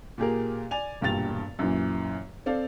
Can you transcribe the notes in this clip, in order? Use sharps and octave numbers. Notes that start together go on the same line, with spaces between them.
A#2 G4 G#4 A#4
D5 G#5 F7
E1 G2 A#2 G5 A6 F7
F#2 A#2 E3
C4 A4 D5 F5